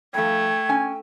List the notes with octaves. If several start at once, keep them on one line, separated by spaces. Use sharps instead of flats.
G2 F3 A3 G5 G#6
C#4 G#5